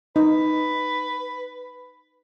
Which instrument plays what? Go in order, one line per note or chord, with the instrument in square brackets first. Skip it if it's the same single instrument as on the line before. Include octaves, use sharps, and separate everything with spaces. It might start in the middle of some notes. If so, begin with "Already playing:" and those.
[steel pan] D#4 [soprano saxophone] B4